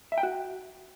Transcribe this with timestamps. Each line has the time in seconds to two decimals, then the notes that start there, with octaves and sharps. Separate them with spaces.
0.12 E5
0.18 G5
0.23 F#4